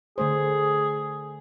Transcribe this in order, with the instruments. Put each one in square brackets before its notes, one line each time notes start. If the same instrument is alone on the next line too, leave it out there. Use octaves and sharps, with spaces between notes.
[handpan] D3 A3 C5 [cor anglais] G#4